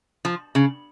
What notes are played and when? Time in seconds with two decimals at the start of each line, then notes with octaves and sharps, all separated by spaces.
0.25 F3
0.55 C#3